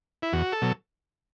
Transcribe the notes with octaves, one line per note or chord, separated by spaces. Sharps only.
E4
E2 F#4
A4
B2 F#3